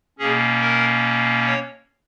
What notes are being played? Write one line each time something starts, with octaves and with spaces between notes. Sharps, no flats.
B2 A#3 C#4 G#4
A#4
C#5